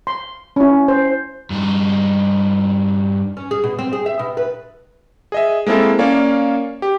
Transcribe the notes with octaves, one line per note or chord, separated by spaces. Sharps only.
C6
C#4 E4
C5
G2 D#4
C#4
G#4
B2
C4
G#4
E5
B2
B4
G#4 D#5 E5
G#3 A#3 C4 E4 A4
A#3 C#4 C#5 D5 F5
G4